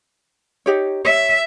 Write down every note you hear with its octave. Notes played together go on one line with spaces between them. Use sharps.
D#4 G4 C#5
C#5 E5